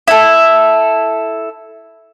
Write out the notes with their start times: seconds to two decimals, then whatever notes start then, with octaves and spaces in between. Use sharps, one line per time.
0.08 E4 A4